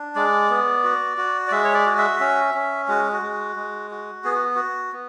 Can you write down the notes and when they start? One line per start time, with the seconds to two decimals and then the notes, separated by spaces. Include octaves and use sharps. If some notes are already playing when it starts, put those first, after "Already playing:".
Already playing: D4
0.15 G#3 D5
0.50 B3
0.84 F#4
1.18 F#4
1.47 D5
1.52 G#3 E5
1.64 C#5
1.74 D5
1.86 F#4
1.98 E5
2.20 C#4 E5
2.54 C#4
2.88 G#3 F#4
3.12 F#4
3.22 G#3
3.56 G#3
3.91 F#4
4.24 B3 G#4
4.35 F#4
4.55 F#4
4.93 B3